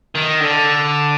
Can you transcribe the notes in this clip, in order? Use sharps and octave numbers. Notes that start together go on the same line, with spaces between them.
D#3
D3